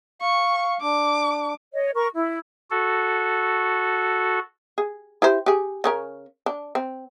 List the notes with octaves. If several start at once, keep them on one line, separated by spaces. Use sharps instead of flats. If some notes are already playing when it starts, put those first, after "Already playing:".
F5 C#6
D4 D6
C#5 D#5
A#4 C#6
E4
F#4 A4
G#4
E4 G4 C5
G4 G#4
C#3 C#4 A#4
D4
C4